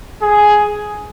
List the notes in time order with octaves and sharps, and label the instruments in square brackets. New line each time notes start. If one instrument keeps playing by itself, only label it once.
[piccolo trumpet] G#4